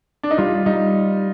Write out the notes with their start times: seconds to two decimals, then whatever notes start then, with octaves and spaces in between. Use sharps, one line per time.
0.23 D4
0.31 D#4
0.38 G3 F4
0.66 G3 D#4